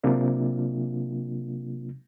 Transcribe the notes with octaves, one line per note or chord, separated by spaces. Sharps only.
C3 F#3 A#3 D4 F4